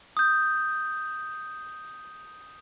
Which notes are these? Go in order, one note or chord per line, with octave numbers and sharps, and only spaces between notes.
D#6 G6